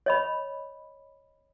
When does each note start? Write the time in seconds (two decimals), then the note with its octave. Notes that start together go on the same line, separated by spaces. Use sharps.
0.06 C#5 D#5 B5